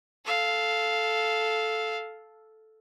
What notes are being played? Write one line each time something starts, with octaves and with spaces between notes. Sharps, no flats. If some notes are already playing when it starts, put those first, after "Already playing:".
A4 F5